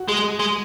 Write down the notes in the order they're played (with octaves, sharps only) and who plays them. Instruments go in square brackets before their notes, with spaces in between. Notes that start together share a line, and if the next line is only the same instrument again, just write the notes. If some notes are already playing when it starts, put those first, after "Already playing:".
Already playing: [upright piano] F#4
[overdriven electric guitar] G#3 [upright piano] G#4
[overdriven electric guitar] G#3